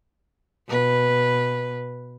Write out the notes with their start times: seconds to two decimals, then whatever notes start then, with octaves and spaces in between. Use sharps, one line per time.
0.68 B2 B4